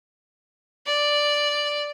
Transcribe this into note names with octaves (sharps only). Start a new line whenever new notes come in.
D5